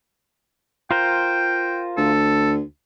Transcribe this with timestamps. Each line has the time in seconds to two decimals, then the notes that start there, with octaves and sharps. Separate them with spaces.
0.91 F4 A#4 C5 G5
1.98 D2 A4